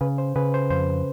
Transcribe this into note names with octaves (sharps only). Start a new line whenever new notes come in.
C#3 B4
C5
C#3 B4
C5
F2 C5